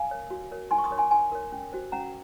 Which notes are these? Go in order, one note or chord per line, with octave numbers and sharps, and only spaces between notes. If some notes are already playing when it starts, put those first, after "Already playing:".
Already playing: F5 G#5
A#4 C#5
F#4
A#4 C#5
D#4 G#5 C6
C#6
C6 D#6
A#4 C#5
G#5 C6
D#4 G#5 C6
A#4 C#5
C#4
F#4 C5
C#4 F#5 A#5